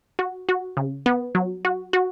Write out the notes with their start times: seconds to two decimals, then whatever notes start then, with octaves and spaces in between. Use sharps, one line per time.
0.19 F#4
0.49 F#4
0.77 C#3
1.06 B3
1.35 F#3
1.65 F#4
1.93 F#4